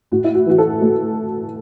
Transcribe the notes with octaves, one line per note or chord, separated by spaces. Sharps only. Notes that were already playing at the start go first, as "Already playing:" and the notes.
A2 F#4
E4
F#4
E3 F#4
A4
A3